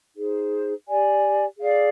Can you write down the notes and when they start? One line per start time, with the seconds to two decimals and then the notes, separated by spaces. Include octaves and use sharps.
0.15 D#4 G#4 C5
0.87 G4 D5 G#5
1.57 G#4 D5 F5